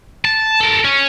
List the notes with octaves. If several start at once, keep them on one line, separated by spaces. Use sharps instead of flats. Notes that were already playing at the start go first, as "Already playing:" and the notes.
A5
A4 A#4
C#4